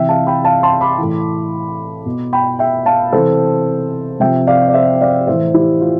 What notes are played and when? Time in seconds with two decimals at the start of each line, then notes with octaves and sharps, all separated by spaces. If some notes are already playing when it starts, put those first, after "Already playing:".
Already playing: C3 E3 E5 G5
0.09 F5 A5
0.27 G5 B5
0.45 F5 A5
0.63 A5 C6
0.81 B5 D6
0.98 A2 E3
2.06 B2
2.33 G5 B5
2.59 E5 G5
2.86 F5 A5
3.12 C3 E3 A4 C5
4.20 C3 F3 E5 G5
4.47 D5 F5
4.68 D5
4.74 C5 E5
5.01 D5 F5
5.27 A2 E3 C5 E5
5.54 E4 G4
5.81 F4